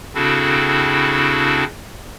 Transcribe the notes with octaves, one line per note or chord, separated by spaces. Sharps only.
C#3 C4 D4 E4 F#4 A4